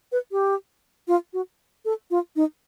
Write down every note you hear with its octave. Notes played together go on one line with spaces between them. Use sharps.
B4
G4
F4
F#4
A4
F4
D#4